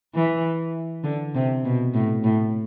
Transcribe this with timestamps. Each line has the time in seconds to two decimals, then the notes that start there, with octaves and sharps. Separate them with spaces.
0.15 E3
1.04 D3
1.35 C3
1.65 B2
1.94 A2
2.24 A2